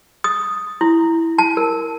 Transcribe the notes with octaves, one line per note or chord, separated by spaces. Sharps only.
D#6
E4
A5
A#4